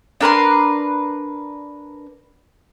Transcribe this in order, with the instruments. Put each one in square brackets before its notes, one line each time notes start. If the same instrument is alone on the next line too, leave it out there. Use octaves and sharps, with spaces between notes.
[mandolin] D4 A#4 B4 C6